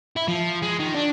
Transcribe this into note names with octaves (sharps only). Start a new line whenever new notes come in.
E4
F3
G#3
D#3
D4